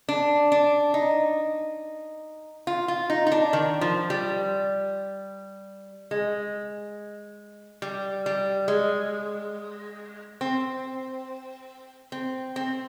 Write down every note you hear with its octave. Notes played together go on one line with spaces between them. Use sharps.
D4
D4
D#4
F4
F4
D#4
D#4
D4
D#3
F3
G3
G#3
G3
G3
G#3
C4
C4
C4